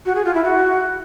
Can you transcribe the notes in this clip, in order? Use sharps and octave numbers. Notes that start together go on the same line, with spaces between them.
F#4
G#4
F4
E4
F#4